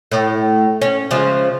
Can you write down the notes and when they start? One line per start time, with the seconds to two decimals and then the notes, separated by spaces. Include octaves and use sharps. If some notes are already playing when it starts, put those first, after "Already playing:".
0.11 A2
0.81 C#4
1.11 C#3 F3 G#3